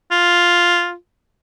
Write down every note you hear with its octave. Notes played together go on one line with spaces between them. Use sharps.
F4